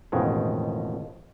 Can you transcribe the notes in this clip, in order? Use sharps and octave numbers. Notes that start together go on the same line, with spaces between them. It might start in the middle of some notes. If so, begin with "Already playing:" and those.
A1 F2 B2 D#3 G#3